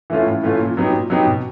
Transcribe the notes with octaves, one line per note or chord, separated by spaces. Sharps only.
E3 A3 C#4 F4
A2
E3 A3 C#4 F4
A#2
F#3 B3 D#4 G4
A#2
F#3 B3 D#4 G4
B2